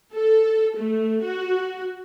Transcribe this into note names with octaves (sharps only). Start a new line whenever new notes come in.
A4
A3
F#4